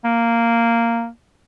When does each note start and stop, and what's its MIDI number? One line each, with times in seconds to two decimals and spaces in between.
0.04 1.07 58